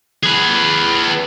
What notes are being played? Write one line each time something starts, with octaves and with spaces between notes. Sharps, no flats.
G#4 B4